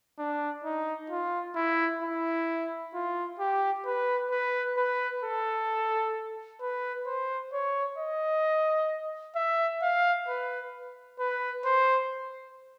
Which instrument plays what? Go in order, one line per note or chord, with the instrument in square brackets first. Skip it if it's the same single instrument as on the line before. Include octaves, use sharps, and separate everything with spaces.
[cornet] D4
D#4
F4
E4
E4
F4
G4
B4
B4
B4
A4
B4
C5
C#5
D#5
E5
F5
B4
B4
C5